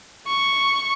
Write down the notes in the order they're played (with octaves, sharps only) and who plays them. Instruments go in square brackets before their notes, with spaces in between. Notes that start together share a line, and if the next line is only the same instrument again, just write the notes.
[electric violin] C#6